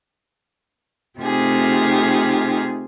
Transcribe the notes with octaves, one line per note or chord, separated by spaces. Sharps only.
C3 A3 D#4 F4 G4 G#4